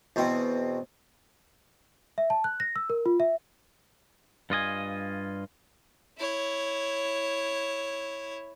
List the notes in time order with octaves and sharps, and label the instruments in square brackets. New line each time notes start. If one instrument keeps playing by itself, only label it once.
[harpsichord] E2 B2 C4
[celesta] E5
A5
F#6
A#6
E6
A#4
F4
E5
[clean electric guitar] G2 F4 D#5 G#5
[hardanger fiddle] E4 C#5